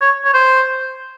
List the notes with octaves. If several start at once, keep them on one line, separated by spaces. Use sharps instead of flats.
C#5
C#5
C5